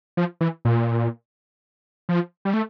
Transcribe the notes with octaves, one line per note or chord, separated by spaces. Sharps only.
F3
E3
A#2
F3
G3
A3